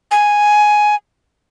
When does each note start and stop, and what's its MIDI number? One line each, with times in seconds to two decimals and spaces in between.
0.11 0.95 80